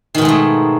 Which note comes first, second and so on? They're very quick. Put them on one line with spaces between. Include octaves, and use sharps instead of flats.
D#3 B2 G#3 G#2 A3